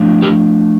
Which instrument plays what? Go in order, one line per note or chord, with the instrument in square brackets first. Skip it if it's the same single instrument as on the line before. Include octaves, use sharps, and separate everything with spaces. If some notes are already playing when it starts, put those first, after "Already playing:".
Already playing: [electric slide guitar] F3 A3 D4
G4 A#4